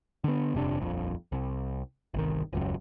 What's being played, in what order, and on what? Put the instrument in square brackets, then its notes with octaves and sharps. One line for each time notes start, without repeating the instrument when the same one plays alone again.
[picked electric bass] D3 B3
D#1 F2 C3 D4
D#1 A#1 F2
C2
G1 C2 D#3
D#1 C#2 F#2